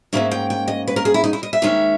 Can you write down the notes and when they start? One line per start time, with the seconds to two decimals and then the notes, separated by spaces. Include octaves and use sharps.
0.13 G#2 E3 A#3 C#4 E5
0.31 G5
0.50 G5
0.68 D#5
0.87 B4
0.96 A#4
1.05 G#4
1.14 E4
1.24 D#4
1.33 E4
1.43 D#5
1.53 E5
1.62 D#2 D#3 G#3 C#4